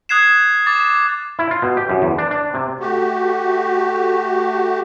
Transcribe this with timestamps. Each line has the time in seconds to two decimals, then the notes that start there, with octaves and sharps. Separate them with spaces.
0.09 D#6 F#6 G#6 C7 E7
0.66 D6 A6
1.39 E4
1.51 F4
1.62 B2
1.77 G4
1.89 F#2
2.02 E2
2.18 D4
2.31 D4
2.54 C3
2.80 A3 F#4 G4